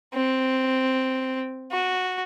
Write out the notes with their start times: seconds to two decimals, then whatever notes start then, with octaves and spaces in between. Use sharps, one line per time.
0.14 C4
1.72 F#4